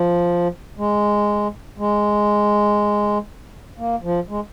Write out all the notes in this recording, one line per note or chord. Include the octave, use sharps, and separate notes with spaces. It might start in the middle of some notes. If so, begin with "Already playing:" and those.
Already playing: F3
G#3
G#3
A#3
F3
G#3